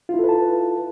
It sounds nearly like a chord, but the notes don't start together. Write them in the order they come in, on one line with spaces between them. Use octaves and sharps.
F4 E4 A4 B4 A5